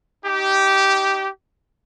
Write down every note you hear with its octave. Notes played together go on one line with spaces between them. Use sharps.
D#4 G4